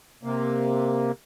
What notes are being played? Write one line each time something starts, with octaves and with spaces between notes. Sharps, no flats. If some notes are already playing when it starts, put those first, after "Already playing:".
C3 A#3